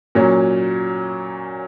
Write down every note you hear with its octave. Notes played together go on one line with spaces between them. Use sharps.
A#2 F#3 C#4